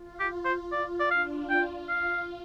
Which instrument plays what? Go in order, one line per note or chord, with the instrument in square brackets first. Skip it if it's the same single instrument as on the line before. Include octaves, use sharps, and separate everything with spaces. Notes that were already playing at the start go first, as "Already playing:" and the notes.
Already playing: [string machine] F4
[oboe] G4
C5
[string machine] F4 [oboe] D5
[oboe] D5
[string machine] D4 [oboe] F5
[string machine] F4 [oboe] G5
[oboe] F5